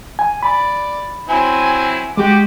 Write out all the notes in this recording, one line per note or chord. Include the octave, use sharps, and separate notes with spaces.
G#5
D5 B5
F#3 C4 E4 G#5
G#3 F#4 G4 D6